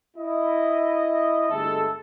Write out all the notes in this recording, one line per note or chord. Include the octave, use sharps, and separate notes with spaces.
E4 D#5
G1 G#3 A3 A4